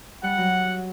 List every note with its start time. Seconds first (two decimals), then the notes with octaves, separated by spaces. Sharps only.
0.23 G3 F#5
0.38 F#3